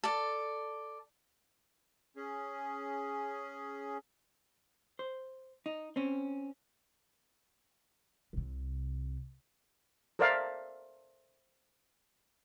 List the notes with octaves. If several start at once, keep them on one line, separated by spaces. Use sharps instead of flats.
A4 D5
C#4 G#4
C5
D#4
C4 C#4
C2 C3
A4 A#4 C5 D5 E5 F5